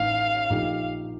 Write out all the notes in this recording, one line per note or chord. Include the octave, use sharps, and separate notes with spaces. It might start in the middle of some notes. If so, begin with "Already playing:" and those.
Already playing: A1 A2 D#4 F5
A#1 A#2 A3 D#4 G4